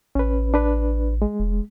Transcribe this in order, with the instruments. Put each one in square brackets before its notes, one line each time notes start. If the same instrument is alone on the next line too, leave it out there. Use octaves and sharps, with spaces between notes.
[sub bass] A1 [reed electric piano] C#4 B4
[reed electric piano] D4 B4
G#3
[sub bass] E1